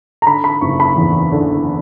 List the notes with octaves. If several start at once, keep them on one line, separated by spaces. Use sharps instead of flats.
A#5
D3 B5
B5
F#1 C#6
B5
E2
D3